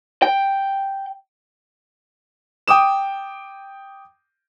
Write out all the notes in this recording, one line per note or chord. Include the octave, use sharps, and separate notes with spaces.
G5
G5 D6 D#6 E7